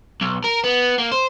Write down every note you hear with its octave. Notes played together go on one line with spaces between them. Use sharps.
B1
A#4
B3
A#3
C5